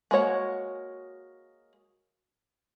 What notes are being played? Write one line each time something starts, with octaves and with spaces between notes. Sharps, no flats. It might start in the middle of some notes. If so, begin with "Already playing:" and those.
G#3 A#3 F#4 C#5 F#5